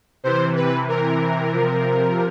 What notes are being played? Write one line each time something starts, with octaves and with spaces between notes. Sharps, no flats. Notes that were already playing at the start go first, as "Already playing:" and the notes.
C3 E3 C5
B4
A#4
C3 F3